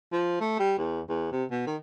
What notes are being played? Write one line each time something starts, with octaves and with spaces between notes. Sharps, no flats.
F3
A3
G3
E2
E2
C3
B2
D#3